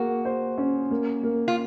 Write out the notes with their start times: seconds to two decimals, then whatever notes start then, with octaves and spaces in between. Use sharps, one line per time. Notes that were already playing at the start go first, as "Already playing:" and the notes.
Already playing: A#3 F#4 G#4
0.25 C5
0.58 C#4
0.91 A#3
1.23 A#3
1.48 F4